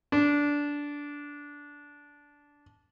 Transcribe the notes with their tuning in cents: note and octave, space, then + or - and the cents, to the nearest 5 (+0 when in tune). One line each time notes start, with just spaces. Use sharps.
D4 -15